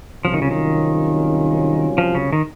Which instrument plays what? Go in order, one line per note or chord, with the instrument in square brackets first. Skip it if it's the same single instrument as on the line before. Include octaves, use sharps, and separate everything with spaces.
[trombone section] C2 C3 F#3 C#4 F4 [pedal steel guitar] F3
[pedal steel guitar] D#3
C#3
D#3
F3
C#3
D#3